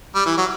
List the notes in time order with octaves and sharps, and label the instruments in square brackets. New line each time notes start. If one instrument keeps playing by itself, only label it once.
[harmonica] G3
E3
F#3